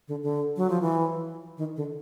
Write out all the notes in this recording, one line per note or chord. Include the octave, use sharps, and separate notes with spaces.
D3
D3
F#3
F3
E3
D#3
D3